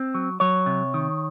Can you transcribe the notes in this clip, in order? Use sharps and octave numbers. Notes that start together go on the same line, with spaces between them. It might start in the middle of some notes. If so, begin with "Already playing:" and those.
Already playing: C4
F#3
F#3 C#5
C3
D#3